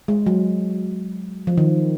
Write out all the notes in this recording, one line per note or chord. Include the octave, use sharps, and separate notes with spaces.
G#3
F#3
F3
D#3